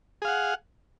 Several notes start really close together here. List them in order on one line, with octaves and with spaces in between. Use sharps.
G#4 F5 F#5